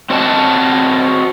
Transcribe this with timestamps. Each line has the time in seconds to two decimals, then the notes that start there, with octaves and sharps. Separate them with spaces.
0.10 C4 F#4 C#5 D#5 A5